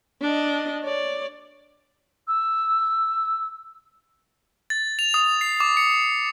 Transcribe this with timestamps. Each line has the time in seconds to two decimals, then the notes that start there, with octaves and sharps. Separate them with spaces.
0.22 D4 D#5
0.83 C#5 D5
2.28 E6
4.70 A6
4.99 F7
5.14 D#6
5.41 C7
5.60 D6
5.77 C#7